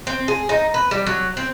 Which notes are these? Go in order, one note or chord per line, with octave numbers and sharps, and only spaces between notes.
C4
G#4
D#4
B4
G3
F#3
C4